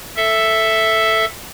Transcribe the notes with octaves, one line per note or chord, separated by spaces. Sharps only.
A4 E5